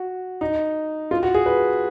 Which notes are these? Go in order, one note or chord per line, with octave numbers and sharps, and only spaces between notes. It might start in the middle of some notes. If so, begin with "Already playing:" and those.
Already playing: F#4
D#4
F4
F#4
G#4
B4